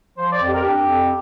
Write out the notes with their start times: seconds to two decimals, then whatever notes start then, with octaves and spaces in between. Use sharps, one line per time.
0.17 F3 C5
0.32 D5
0.40 F2
0.47 G4
0.54 A#4
0.62 D4 G4
0.86 F2